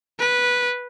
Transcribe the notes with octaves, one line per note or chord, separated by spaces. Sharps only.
B4